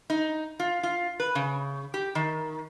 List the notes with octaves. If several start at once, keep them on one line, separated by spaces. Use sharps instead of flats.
D#4
F4
F4
B4
C#3
G4
D#3